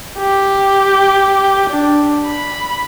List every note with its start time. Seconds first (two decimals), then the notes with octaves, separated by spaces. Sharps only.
0.18 G4
1.70 D4
2.26 B5